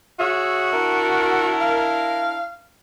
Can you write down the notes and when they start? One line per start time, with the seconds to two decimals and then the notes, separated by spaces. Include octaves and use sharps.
0.20 F#4 G#4 C#5 E5
0.73 D4 E4 A#4
1.61 F5